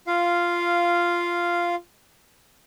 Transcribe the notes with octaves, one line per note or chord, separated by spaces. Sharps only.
F4 F5